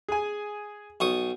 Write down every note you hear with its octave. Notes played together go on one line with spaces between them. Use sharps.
G#4 G#5
B1 C#6 D#6